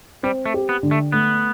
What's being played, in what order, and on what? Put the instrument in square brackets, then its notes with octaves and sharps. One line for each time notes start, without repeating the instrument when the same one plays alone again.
[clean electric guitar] G3 [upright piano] C4
[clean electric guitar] A3
[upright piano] G4
[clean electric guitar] B3
[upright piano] D3
[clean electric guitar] A3
[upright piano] A3 [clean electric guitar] B3